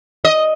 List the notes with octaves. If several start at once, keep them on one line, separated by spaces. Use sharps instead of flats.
D#5